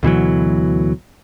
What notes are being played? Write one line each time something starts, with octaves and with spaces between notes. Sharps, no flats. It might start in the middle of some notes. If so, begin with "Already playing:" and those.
D2 B2 E3 F#3